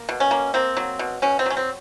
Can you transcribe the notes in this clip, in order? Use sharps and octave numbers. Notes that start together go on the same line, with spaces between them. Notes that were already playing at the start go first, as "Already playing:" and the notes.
Already playing: A#3
B2
C#4
A#3
A#3 C4
F#3
B2
B2 C#4
C4
F#3 C#4
C4